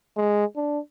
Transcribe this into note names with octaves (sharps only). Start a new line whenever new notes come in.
G#3
D4